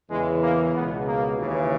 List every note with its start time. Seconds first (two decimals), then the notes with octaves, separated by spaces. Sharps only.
0.10 E2 C#3 E3 G#3
0.42 A#3
0.75 C#2 B2 B3
1.06 A#3
1.38 D#2 C#3 E3